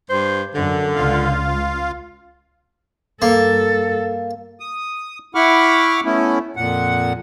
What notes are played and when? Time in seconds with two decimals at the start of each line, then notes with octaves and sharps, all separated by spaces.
0.10 G2 C5
0.55 F#2 D3
0.95 C#2 F4 F5
3.22 G2 A#3 A4
4.60 D#6
5.35 E4 F#5 B5 C#6 D6 F6
6.05 A3 B3 C#4 E4
6.57 F2 A#2 F#5